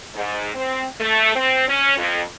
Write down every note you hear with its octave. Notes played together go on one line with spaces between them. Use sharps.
G#2
C4
A3
C4
C#4
F2